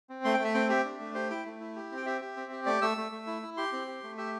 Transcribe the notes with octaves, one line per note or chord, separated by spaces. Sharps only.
C4
A3 C6
G5
A3
E5
C4 G5
G4 E5
D4
A3
G4 C5
E4 G5
A3
E4
G4
C4
G5
G4 E5
G4
C4
G4
A3 D5
A3 E6
A3
A3
E4
E4
G4 C6
C4
G4
A3
G4 E5